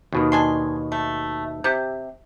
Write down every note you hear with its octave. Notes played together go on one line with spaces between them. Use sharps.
D#2 B2 D#3
D4 G#5 C6
A3
C3 G4